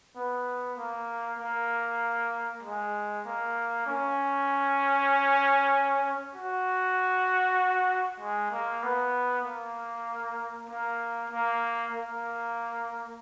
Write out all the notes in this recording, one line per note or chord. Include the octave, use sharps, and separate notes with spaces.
B3
A#3
A#3
G#3
A#3
C#4
F#4
G#3
A#3
B3
A#3
A#3
A#3
A#3